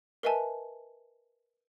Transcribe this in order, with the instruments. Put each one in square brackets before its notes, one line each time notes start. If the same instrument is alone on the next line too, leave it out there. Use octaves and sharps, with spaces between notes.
[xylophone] A#4 B4 D#5 E5 G#5 A5